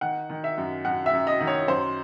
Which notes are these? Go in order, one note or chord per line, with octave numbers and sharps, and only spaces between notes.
D#3 F#5
D#3
E5
F#2
F#2 F#5
E5
F#2
D#5
D#3
C#5
F#2 C5